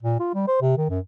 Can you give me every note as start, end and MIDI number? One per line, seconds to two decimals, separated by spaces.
0.03 0.18 46
0.20 0.32 65
0.34 0.46 55
0.47 0.57 72
0.61 0.77 48
0.78 0.89 51
0.90 0.99 42